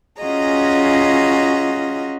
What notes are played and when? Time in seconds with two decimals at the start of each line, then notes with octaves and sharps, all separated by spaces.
0.21 C#4 F4 F#4 G#4 D#5 A#5